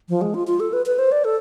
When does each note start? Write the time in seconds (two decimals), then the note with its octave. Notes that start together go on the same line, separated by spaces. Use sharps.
0.09 F3
0.21 G#3
0.34 F4
0.47 F4
0.60 A4
0.73 B4
0.86 B4
0.99 C5
1.12 D5
1.24 A4